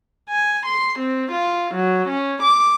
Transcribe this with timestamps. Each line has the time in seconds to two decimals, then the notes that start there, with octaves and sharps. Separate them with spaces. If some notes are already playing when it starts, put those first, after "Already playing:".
0.30 G#5
0.66 C6
0.99 C4
1.32 F4
1.75 F#3
2.09 C#4
2.43 D6